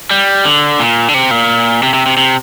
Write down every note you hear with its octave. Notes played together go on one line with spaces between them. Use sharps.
G3
D3
A#2
D3
C3
A#2
C3
C3
C3
C3